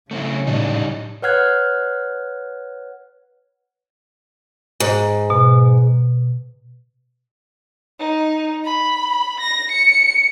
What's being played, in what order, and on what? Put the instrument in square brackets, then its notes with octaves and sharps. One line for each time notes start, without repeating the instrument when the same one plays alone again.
[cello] C#3 F#3 [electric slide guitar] A3 C4 E4
[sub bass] A2 [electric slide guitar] G3 D4 D#4
[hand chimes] B4 C#5 F#5 F6 F#6 G#6
[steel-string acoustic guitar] G#2
[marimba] B2
[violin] D#4
B5
A#6
C#7